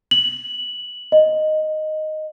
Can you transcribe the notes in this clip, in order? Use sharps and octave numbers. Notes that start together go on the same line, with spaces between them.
F#7
D#5